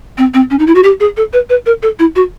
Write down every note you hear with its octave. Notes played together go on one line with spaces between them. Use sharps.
C4
C4
C#4
D#4
E4
F#4
G4
G#4
A4
B4
B4
A#4
A4
E4
F#4